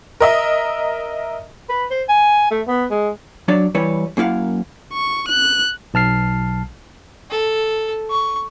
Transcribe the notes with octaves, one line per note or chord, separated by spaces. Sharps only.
A#4 D#5 E5
B4
C5
G#5
A3
B3
G#3
F#3 D4 C#5 D5
E3 G3 E4 B4 C#5
F#2 A#3 E4 F5 F#5
C#6
F#6
B1 A5 F6 C7
A4
C#6